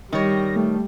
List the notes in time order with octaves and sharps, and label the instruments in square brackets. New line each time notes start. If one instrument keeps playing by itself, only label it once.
[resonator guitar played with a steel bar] D#3 C#5 [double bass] G3 [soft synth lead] A#6
[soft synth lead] A3